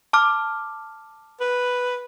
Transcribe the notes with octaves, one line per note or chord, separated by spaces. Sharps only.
A5 D6 F6
B4